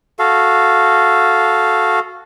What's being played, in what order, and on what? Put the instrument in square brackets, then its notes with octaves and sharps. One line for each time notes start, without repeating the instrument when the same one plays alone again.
[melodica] F#4 A4 F5